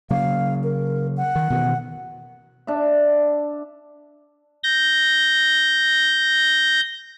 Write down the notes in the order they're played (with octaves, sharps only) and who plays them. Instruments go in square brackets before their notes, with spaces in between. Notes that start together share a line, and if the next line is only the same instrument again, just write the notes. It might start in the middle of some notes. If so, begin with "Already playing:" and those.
[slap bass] C#3 F#3 A#3 [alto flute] F5
[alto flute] A#4
F#5
[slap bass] D#3
B2 D#3 E3
[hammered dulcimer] D4 E5
[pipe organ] G6 A#6